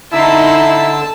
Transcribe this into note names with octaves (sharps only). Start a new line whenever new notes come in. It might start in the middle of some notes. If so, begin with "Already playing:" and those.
D3 D#4 E4 A5 C6 E6